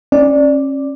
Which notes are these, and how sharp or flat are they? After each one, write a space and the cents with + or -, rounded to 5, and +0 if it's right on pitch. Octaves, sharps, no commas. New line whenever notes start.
C#4 -30 D5 +0